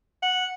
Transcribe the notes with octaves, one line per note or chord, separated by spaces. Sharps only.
F#5